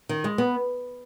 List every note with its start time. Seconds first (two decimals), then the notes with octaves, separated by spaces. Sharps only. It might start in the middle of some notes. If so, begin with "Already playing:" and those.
0.09 D#3
0.24 G#3
0.38 B3